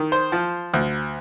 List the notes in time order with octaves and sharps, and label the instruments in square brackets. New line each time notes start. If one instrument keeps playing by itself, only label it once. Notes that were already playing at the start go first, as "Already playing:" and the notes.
Already playing: [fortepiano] D#3
C5
F3
D2